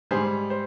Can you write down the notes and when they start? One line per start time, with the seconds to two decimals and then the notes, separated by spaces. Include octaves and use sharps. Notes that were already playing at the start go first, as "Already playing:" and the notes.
0.11 G#2 G3 G#4 C5
0.50 C5